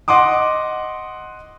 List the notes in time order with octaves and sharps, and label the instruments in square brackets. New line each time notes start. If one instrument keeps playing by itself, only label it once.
[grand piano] D#5 F#5 C6 D6 D#6